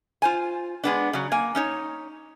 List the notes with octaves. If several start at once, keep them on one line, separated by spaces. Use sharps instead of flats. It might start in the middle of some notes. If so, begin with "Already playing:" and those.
F4 C5 G#5
G#3 B3 D4
C#3 F#3
A#3 G#5
C#4 D#4 C#5